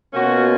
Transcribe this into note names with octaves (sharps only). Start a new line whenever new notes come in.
B2 A#3 C#4 F4 F#4